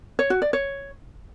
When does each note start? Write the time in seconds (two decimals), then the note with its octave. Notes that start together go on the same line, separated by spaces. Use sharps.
0.19 C#5
0.30 F#4
0.42 D5
0.53 C#5